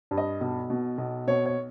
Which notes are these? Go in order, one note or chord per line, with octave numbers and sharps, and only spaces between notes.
G2
D#5
B1
B2
B1
B2 C#5
C#5